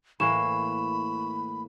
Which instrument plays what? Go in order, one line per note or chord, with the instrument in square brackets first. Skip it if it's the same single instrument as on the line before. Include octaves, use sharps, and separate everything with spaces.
[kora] A2 E3 A#3 [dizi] B5 [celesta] C#6 E7